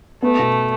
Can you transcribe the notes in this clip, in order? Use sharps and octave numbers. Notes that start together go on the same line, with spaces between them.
A3 B3
B2